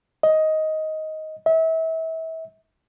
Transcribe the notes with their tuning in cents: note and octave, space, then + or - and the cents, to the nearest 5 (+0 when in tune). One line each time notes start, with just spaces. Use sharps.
D#5 +10
E5 -35